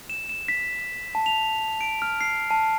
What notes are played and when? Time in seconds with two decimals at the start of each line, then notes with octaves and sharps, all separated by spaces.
0.10 E7
0.29 E7
0.48 B6
1.15 A5
1.26 F7
1.81 D7
2.02 F6
2.21 C7
2.51 A5